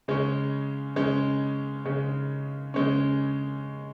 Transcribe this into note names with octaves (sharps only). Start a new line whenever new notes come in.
C#3 G#3 C#4
C#3 G#3 C#4
C#3 G#3 C#4
C#3 G#3 C#4